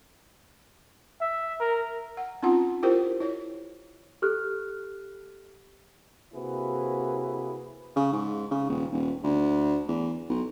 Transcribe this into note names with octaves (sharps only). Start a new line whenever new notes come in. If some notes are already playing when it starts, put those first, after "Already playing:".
E5
A#4
F#5
C4 C#4 D#4 F4 F#5
E4 F4 G4 A#4 C5 G5
E4 C#5
G4 A4 F6 F#6
C3 A#3 E4 F#4 G#4 B4
C#3
G#2
C#3
D#1
D#1
D2
E2
B1